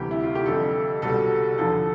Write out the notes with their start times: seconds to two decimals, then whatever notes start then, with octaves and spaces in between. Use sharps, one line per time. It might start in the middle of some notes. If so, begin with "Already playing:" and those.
Already playing: D2 C3 E3 G3 G4
0.11 E4
0.24 F4
0.35 G4
0.46 F2 D3 G3 A4
1.02 C2 B2 G3 A4
1.58 E2 D3 F3 A4